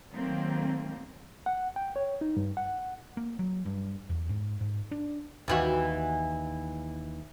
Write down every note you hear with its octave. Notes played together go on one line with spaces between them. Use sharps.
D#3 F#3 A3 A#3 C4
F#5
G5
C#5
D#4
G2
F#5
A#3
F#3
G2
E2
G#2
G#2
D4
D#2 E3 F#4